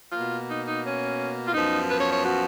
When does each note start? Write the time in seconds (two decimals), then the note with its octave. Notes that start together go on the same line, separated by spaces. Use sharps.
0.13 B2 A#3 F4
0.48 D#4
0.66 D#4
0.84 C#4
1.47 F4
1.54 F#2 F3 B3 D#4
1.89 B4
2.00 C#5
2.13 C#5
2.24 F#4